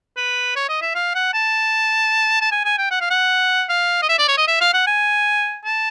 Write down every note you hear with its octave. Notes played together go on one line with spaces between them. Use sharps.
B4
C#5
D#5
E5
F5
F#5
A5
A5
G#5
G#5
G5
F#5
F5
F#5
F5
D#5
E5
D5
C#5
D#5
E5
F5
F#5
G#5
A5